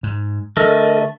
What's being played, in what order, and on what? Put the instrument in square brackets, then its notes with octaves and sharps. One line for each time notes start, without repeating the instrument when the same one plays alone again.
[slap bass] G#2
[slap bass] D3 [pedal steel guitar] A3 [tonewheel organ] A4 A#4 D#5